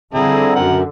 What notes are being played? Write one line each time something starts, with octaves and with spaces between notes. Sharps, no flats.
F2 D3 G3 C4 E4 G#4 A#5
F#2 A#4 F#5